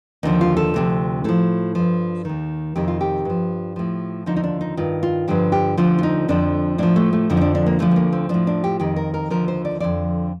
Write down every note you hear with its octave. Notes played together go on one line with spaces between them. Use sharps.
D#2 D3 F3 D#4
F4
A4
D2 C3 F3
A2 F3 A4
G2 F3
D#2 D#3
F2 C3 D#3 G4
F4
G4
G2 F3
A2 F3
D#2 D3 F3 D#4
D#4
D4
D#4
G2 D#3 F4
F4
G2 D3 F3 G4
G4
D2 D3 F3 F4
F4
D#4
F2 D3 F3 D4
A2 F3 D4
A3
A3
F2 D3 F3
D#4
D4
D4
A#3
D2 D3 F3 A3
A3
A#3
C4
A2 F3 D4
D4
G4
F2 D#3 G4
A#4
A#4
D#2 D3 F3 A#4
C5
D5
F2 D3 F3 D5